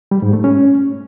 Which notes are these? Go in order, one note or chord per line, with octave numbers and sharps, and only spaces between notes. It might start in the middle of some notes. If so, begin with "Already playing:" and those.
G3
G#2
A3
C#4